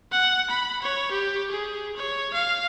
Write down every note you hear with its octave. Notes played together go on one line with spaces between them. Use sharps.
F#5
B5
C#5
G4
G#4
C#5
F5